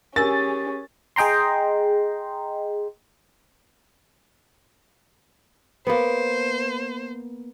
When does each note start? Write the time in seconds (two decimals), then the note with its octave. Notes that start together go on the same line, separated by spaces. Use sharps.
0.16 C#4 G4 G#4 A#4 G#5 E6 A6
1.16 G#4 D#5 G5 A#5 C6
5.87 A#3 B3 C5